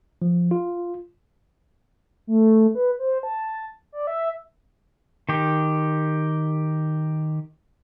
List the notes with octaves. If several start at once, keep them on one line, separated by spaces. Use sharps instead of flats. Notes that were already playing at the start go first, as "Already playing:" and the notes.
F3
F4
A3
B4
C5
A5
D5
E5
D#3 G4